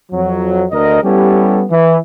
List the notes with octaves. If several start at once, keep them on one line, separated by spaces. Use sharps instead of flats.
F2 F#3
D2 D3 A#4 D#5
G3 B3 C#4 E4 G4 A4
E3